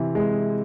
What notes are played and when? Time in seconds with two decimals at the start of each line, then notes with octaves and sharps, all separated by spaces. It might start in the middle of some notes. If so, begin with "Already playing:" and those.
Already playing: C3 E3
0.15 G#3